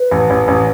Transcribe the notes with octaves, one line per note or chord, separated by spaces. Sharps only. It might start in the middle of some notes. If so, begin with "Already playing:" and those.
Already playing: B4
A1
A1
A1